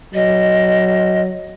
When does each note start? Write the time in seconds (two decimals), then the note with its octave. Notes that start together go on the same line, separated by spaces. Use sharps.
0.14 F#3 D#5